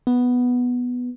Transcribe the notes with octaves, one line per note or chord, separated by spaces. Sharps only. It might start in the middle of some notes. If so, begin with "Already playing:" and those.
B3